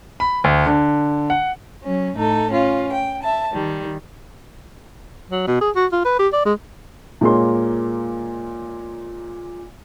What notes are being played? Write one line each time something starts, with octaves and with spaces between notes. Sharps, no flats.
B5
D2
D3
F#5
F#3 C#4
A2 D#4 A4
C#4 F4
G5
E5 A5
D#3 G3
F#3
B2
G#4
F#4
F4
B4
G4
D5
G#3
A#2 G#3 A#3 C#5 C6